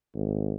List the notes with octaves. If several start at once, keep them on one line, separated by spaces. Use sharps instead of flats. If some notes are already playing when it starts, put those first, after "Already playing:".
G#1